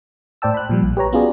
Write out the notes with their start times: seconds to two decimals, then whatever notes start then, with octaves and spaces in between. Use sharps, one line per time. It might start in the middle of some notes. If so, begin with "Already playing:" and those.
0.42 A2 C5 D5 G5 A5 E6
0.54 B5 F#6
0.69 A#2 F3 G3
0.83 A#1
0.97 G4 B4 C#5 A#5
1.13 B3 C#4 F4 F#4 G#4 D5